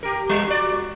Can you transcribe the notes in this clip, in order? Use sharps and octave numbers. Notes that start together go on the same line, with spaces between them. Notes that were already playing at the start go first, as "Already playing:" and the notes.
G4 A#4
G3
F#4 D5